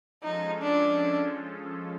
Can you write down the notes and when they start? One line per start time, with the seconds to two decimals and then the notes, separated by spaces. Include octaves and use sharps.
0.23 F3 G#3 C#4 D#4 F4 A4
0.62 D4